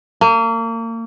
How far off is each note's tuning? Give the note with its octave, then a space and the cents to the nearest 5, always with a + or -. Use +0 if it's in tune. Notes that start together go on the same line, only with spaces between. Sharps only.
A#3 -35